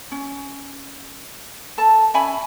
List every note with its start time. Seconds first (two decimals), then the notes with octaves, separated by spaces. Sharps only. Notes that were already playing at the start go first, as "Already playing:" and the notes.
0.12 C#4
1.78 A4 A5
2.14 C#4 E5 G#5 B5